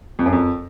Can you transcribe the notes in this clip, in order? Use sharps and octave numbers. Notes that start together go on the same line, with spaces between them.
F2
F#2
F2